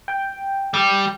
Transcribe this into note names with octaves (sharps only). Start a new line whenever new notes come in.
G5
G3 G5